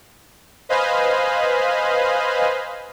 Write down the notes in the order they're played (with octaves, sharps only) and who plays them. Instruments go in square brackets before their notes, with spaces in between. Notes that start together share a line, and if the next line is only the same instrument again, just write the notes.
[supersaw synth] B4 C5 D#5 F5 G#5 B5